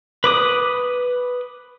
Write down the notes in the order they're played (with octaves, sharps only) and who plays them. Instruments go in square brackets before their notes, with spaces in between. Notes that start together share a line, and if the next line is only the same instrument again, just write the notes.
[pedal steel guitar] B4 D6 D#6